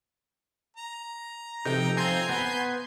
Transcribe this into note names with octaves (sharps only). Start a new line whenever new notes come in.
A#5
C3 F3 D#4 A4 G5
C4 F4 G#5 C6 G6
B3 B4 F#5